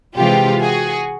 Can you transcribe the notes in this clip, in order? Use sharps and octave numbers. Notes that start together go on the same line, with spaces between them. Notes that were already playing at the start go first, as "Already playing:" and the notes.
C3 E3 G#3 C4 F4 G4
F#4 G#4